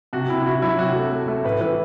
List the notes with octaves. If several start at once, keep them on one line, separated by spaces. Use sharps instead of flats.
C3 F#4
C3 E4
E4
C3 F#4
F#3 E4
C3 F#4
A3
A3
A3
A2 B4
E3 B4